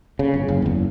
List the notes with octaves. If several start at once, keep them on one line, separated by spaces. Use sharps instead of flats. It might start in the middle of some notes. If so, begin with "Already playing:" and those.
C#3
G1
F#1
F#1 E2